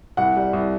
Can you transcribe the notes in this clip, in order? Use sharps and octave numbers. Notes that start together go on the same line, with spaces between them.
C2 F#5
G3
C2